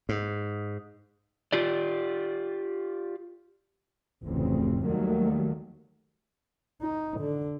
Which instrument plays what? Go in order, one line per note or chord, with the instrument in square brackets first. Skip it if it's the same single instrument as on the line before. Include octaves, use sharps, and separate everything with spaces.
[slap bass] G#2
[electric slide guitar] F4 G4 D5
[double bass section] F1 D2 A2 C#3 E3 C4
D#2 D#3 F#3 G3 A3 A#3
[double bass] D#4
D3